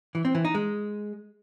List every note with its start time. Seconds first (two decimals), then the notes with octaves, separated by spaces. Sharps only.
0.15 E3
0.25 C4
0.35 E3
0.45 D#4
0.55 G#3